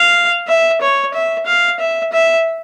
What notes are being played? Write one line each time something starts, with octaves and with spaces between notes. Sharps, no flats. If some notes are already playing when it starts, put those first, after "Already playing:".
Already playing: F5
E5
C#5
E5
F5
E5
E5